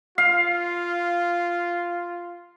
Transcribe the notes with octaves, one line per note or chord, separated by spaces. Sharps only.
F4 F5